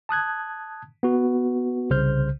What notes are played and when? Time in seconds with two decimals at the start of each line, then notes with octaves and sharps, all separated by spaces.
0.09 A5 D#6 F#6 G#6
1.03 B3 F#4
1.90 C2 C#3 C5 F6 G6